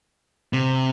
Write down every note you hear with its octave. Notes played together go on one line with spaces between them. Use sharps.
C3